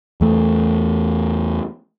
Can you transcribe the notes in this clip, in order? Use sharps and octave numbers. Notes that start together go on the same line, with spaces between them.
E2 A3